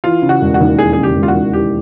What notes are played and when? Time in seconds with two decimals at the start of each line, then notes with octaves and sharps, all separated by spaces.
0.04 E3 F4
0.22 C#3
0.29 F#4
0.41 E1
0.54 F#4
0.60 D#2
0.79 E3 G#4
0.93 C#3 G#4
1.03 G4
1.16 E1
1.23 F4
1.28 F#4
1.35 D#2
1.53 E3 G4